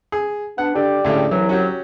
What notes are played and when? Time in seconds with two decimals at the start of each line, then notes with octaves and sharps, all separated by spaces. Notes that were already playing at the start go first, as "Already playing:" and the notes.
0.12 G#4
0.58 B3 D4 F#5
0.75 D3 G4 D5
1.04 D2 A2 C#3
1.31 C2 E3 F#3
1.49 C#4 F#4 G4